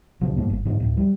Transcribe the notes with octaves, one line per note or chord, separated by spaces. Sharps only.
D#1 C#2 C#3 F#3
G2 A#3
G1
G#2 D3
D2 A2
G3